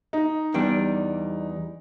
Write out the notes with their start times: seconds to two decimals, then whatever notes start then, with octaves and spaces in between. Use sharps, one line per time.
0.13 D#4
0.54 E2 G3 D4